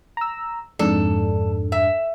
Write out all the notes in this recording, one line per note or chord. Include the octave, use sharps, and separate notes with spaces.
A#5 E6
F2 G#2 D4 A4
E5